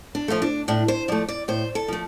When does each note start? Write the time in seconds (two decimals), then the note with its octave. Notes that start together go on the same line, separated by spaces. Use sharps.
0.15 D4
0.28 F3 A3 F4
0.42 D4
0.68 A2 D4
0.88 C5
1.08 F3 A3 D5
1.28 D5
1.48 A2 C5
1.75 A4
1.88 F3 A3